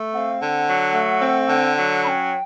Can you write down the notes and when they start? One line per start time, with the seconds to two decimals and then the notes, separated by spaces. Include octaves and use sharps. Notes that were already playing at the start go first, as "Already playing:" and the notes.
Already playing: A3
0.14 C4 F#5
0.18 F5
0.40 D3 F#5
0.68 F#3
0.94 A3
1.22 C4
1.49 D3
1.77 F#3
2.04 C#4 G5 B5